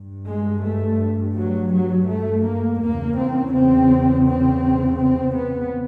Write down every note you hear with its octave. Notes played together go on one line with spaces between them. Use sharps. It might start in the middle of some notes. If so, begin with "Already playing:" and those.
Already playing: G2
G#3
A3
F#3
F#3
A3
A#3
E2 C#3 A#3
C4
C4
C4
C4
B3